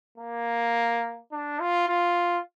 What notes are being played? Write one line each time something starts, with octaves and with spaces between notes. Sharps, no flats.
A#3
D4
F4
F4